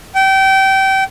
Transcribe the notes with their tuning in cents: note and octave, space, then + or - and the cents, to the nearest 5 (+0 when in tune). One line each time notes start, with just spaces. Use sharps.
G5 -25